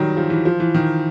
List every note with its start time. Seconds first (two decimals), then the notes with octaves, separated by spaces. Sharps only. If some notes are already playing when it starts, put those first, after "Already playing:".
Already playing: D#3 F#3 G3
0.17 F3
0.30 E3
0.45 F3
0.60 E3
0.74 D#3